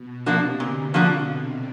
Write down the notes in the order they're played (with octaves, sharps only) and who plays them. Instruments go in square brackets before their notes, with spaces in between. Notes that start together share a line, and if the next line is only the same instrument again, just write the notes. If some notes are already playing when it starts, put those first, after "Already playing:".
Already playing: [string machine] B2
[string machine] C3 [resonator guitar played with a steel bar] F3 A#3 D4 F#4
[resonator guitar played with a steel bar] A#2 [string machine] D3
[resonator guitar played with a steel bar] F3 A#3 D4 F#4